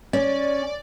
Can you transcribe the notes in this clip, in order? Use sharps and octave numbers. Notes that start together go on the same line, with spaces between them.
C#4 D5